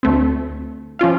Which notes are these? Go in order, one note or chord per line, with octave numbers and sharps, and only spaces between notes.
D2 A3 C4
F3 C#4 F4 F5